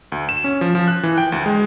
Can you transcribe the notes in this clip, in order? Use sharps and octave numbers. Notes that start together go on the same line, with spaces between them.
D2
E7
C#4
F3
F3
F#6
E3
G5
D2
G#3